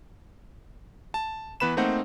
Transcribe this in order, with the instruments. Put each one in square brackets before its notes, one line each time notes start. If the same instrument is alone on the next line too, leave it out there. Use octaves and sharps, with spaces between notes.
[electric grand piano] A5
E3 B3 B4 B5 E7
A3 A#3 C4 D#4 C5 F#5